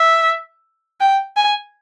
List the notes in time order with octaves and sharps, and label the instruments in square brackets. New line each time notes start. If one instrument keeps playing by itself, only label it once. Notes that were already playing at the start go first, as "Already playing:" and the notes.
Already playing: [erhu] E5
G5
G#5